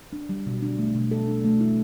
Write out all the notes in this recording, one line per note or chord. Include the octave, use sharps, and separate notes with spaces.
D4
G3
B2
D4
A3
B2
A4
D4
A3
E4